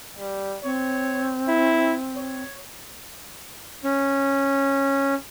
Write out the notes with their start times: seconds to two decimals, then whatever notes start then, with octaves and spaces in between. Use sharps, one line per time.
0.18 G3
0.64 C4 C#5
1.49 E4
2.17 C#5
3.84 C#4